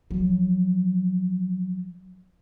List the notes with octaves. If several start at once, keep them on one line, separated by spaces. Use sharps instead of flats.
F3 F#3